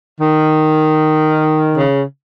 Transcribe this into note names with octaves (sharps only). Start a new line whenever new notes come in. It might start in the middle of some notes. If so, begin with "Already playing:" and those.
D#3
C#3